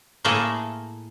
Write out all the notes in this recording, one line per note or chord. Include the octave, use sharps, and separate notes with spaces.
A2 A3 A#3 E4 G#4 A4